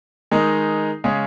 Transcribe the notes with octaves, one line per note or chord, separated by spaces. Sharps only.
D#3 G#3 D#4
C#3 G#3 C#4